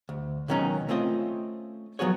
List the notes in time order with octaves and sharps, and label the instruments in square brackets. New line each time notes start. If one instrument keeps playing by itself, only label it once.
[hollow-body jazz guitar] D2
C#2 B2 D#3 F#3 C#4 D#4
A3 C4 C#4 F4 D#5
F3 F#3 B3 F#4 G#4 C#5